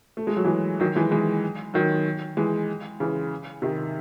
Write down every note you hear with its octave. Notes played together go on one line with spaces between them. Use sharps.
A3
G#3
F#3
E3 G#3
D#3 F#3
E3 G#3
E3 G#3
D#3 F#3
E3 G#3
C#3 E3
C3 D#3